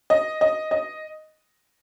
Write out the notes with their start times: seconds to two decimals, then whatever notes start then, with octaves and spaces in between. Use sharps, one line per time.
0.10 D#5
0.41 D#5
0.71 D#5